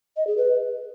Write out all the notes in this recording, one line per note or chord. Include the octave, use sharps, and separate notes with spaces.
D#5
G#4
B4